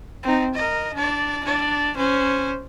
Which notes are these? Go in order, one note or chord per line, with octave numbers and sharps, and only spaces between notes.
C4 D#4
A#4 D#5
D4 D5
D4 D5
C#4 C5